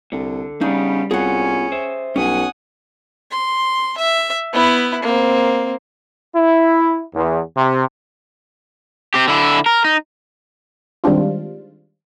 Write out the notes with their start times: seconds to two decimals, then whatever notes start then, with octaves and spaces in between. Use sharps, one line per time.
0.12 C2 D3
0.61 C#3 G3 B3 D4 D#4
1.11 C2 B3 C#4 F4 G#4 F#5
1.72 C5 E5
2.16 B1 G2 C#4 F#5 G#5 D#6
3.31 C6
3.98 E5
4.53 B3 E4
5.03 A#3 C4
6.35 E4
7.14 E2
7.55 C3
9.14 C4 G4
9.28 D3 E4
9.66 A#4
9.84 D#4
11.04 D#3 G3 G#3 C4 D4 F4